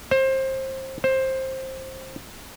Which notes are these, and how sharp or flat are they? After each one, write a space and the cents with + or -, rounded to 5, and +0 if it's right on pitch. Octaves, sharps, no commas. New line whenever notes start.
C5 +25
C5 +15